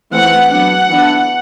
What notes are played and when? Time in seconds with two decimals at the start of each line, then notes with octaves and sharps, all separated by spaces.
0.12 E3 A3 C4 F#5
0.50 F#3 B3 D4 F#5
0.89 E3 B3 D4